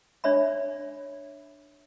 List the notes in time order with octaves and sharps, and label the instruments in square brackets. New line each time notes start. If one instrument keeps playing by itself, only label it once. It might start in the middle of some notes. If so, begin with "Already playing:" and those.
[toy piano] D4 C#5 E5 B5